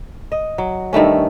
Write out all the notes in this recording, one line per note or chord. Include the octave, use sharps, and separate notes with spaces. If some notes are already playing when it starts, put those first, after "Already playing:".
D#5
F#3
G2 D#3 A3 C#4